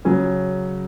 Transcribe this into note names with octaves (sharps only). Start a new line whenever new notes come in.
C#3 F#3 C#4 G#4